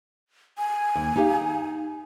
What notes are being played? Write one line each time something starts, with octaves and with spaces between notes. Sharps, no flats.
G#5
D#2
D#4 G4 F5